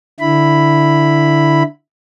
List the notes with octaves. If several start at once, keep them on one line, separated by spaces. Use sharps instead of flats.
D3 E4 B5